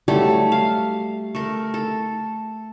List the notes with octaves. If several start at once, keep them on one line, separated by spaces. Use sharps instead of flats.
F#3 G3 A3 A4
F5
A3 A#4
A4